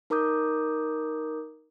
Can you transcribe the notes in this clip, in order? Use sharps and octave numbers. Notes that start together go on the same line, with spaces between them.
D#4 A#4 A#5 D6 D#6 G6